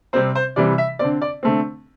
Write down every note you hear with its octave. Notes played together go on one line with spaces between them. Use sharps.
C3 G3 C4 C5
C5
C3 E3 G3 D5
E5
D3 C4 D5
D5
D3 A3 C4